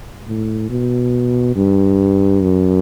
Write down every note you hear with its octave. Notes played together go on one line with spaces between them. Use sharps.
A2
B2
G2
F#2